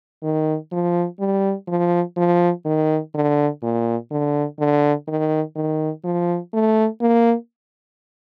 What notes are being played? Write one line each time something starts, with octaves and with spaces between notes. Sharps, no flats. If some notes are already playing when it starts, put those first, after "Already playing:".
D#3
F3
G3
F3
F3
D#3
D3
A#2
D3
D3
D#3
D#3
F3
A3
A#3